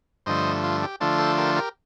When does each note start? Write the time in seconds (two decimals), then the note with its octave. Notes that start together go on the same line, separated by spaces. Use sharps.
0.26 G2 D3 F3 A3 C5 D#5
0.63 F4
0.83 G4
1.00 D3 F3 A3 D4 F4
1.19 A4 C5
1.38 G4 A#4
1.56 G4 A#4